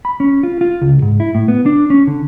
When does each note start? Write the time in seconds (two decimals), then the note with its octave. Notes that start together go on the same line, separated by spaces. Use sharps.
0.05 B5
0.20 C#4
0.43 F4
0.61 F4
0.81 C#2
1.02 G#2
1.20 E4
1.35 A2
1.48 B3
1.66 D4
1.90 C#4
2.07 D3